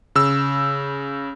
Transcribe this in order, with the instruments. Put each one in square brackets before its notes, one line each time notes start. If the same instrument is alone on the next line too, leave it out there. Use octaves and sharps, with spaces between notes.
[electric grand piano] C#3 E6